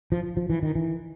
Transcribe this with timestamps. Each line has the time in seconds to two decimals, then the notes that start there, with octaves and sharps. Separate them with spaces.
0.12 F3
0.37 F3
0.50 E3
0.63 D#3
0.75 E3